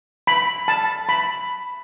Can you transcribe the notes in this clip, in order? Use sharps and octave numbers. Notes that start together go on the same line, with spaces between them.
B5
A5
B5